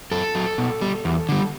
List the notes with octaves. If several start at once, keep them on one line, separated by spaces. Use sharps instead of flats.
F#2 A4
F#3
B2
G3
E2
D3 G3